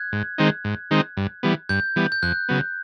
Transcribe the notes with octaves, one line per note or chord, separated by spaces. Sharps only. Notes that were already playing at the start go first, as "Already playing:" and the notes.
Already playing: F#6 G#6
G#2
D#3 G#3 C4 D#4
G#2
D#3 G#3 C4 D#4
G2
E3 G3 B3
G2 G6
E3 G3 B3
G6
F2 F#6
C#3 F#3 B3